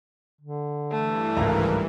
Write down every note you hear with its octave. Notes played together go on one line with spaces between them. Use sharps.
D3
G2 E3 A3
G#1 C#2 A#4 A#5